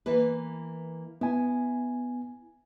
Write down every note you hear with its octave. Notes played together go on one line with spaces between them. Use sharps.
E3 A#3 B4
B3 E4 G#5